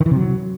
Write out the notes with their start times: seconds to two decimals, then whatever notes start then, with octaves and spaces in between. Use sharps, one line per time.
0.01 D#3
0.06 E3
0.11 C3
0.16 F#3